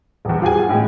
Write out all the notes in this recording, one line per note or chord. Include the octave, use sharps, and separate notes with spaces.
D#1 E2
F4 G4 G#4 F#5 G#5
A2 G#3